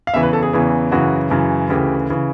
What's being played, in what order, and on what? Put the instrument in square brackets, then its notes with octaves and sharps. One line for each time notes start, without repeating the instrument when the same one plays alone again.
[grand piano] F5
E2 C#3 E3 E5
B4
A4
G#4
E2 C#3 E3
F#2 C#3 E3 F#4
F#2 C#3 E3
D2 C#3 E3 G4
C#3 E3